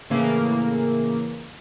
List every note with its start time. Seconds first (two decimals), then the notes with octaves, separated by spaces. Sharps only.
0.10 A2 C#3 E3 A#3